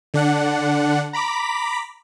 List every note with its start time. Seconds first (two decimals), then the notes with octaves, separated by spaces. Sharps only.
0.14 D3 D4 F#5
1.13 A#5 B5 D6 B6